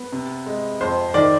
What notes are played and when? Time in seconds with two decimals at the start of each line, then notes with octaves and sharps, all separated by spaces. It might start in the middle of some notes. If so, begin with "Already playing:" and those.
Already playing: B3
0.12 C3
0.46 G#3
0.81 F2 C5
1.14 D#3 D5